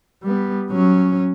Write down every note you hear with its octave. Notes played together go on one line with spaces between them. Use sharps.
G3 B3
F#3 C#4